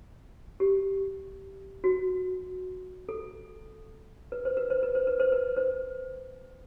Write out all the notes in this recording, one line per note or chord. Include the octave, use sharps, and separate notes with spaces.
G4
F#4
A4
B4
C5
B4
C5
B4
C5
B4
C5
B4
C5